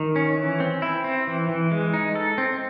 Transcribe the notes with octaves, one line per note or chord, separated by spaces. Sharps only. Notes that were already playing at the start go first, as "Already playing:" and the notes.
Already playing: D#3
C#4
E3
C4
E4
C4
E3
E3
G#3
D#4
A4
C4